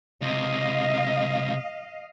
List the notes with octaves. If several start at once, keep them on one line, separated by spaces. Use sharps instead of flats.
C#2 C3 D#5 F5